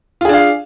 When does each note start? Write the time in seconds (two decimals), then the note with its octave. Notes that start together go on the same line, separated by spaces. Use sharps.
0.21 F4
0.25 G#4
0.29 D4
0.33 F5